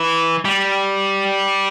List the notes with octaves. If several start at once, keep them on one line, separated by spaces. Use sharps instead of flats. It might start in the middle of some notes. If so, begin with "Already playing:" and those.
Already playing: E3
G3